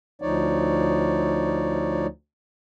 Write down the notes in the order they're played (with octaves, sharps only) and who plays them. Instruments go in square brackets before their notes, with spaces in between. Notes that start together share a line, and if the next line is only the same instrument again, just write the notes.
[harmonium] D2 F3 D#4 C#5 D5